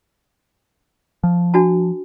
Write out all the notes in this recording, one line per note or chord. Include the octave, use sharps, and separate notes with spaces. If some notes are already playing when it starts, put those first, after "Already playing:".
F3
D4 F#4 A5